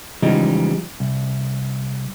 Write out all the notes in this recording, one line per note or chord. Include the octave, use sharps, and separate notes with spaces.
C#3 E3 F3 G3 G#3 D#4
C2